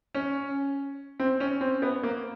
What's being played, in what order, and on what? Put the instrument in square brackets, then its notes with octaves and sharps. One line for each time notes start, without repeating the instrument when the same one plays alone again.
[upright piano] C#4
C4
C#4
C4
B3
A#3